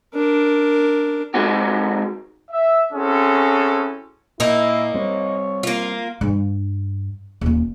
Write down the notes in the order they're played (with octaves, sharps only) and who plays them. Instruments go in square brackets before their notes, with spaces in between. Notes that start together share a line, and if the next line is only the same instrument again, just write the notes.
[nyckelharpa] D4 A#4
[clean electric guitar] G#3 C4 D#4 F#4 G4
[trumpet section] E5
C4 C#4 E4 F#4 G#4 A4
[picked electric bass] A#2 [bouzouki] A#3 D#4 [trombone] E4
[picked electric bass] G3 C4 [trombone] C#5
[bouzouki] A#3 F4
[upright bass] G2
D#1 A#3